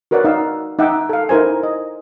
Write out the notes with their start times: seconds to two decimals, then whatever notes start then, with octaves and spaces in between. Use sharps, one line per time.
0.11 F#4 A#4 B4 C#5 D5 F#5
0.24 D#4 F5 E6
0.79 D#4 E5 F#5 G5 D6
1.09 A4 F5
1.29 D#4 E4 A#4 C5 G#5
1.63 D#5